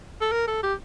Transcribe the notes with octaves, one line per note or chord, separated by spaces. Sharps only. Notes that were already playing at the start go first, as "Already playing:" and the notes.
A4
A#4
A4
G4